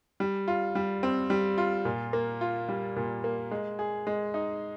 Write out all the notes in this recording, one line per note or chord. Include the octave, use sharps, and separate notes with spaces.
G3
F4
G3
C4
G3
F4
A#2
A#3
F4
G3
A#2
A#3
G#3
G#4
G#3
D#4